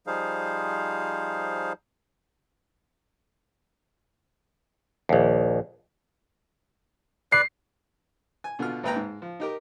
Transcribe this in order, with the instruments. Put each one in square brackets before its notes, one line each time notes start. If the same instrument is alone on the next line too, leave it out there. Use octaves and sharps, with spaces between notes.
[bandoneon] F3 G3 D#4 G#4 C5 F5
[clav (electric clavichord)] A#1 D#2
[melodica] B4 D5 [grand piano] C7
[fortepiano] G#5
B2 D3 B3 F4 F6
G#1 D#2 B4 G5 A#5
G#2
F3
D#4 G4 A#4